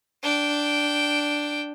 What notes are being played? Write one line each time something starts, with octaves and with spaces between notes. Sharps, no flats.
D4 G5